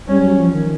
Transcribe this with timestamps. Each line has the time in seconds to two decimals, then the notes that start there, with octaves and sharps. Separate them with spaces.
0.08 G3 C#4
0.22 F#3
0.37 F3
0.53 D#3